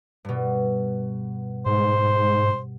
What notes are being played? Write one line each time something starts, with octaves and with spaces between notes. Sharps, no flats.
G2 B2
G#2 C5